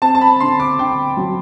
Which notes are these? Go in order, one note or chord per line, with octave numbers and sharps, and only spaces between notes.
C4 A5
A5
B5
D3 C6
D6
D3 G5
F#3